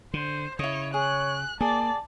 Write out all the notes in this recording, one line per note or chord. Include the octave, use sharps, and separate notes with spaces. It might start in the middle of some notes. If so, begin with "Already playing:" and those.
D3 C5
C#3 E4 C#5 D#5
G#4 C#5 F#6
A#3 G#4 D5 A5